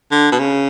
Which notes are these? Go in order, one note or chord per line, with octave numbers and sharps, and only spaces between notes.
D3
B2
C#3